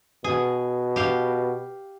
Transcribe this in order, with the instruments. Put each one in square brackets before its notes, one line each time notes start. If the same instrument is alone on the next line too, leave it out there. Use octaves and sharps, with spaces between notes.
[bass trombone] B2 [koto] G#4
[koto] G4 F5